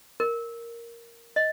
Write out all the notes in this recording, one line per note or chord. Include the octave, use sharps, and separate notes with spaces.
A#4
D#5